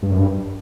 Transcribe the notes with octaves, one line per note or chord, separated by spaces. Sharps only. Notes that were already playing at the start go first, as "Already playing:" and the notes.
G2
F#2
G2